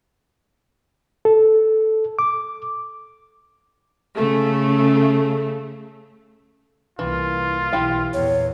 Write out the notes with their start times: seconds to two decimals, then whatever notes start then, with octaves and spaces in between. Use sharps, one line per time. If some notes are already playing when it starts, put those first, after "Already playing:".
1.25 A4
2.19 D6
4.15 C#3 A3
6.99 C2 E3 A#3 F4
7.73 B1 E3 E4 G4 F5
8.13 E2 A#2 C#5